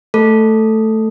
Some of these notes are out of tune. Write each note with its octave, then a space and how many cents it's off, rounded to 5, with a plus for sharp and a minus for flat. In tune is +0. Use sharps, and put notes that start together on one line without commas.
A3 +0 A4 +0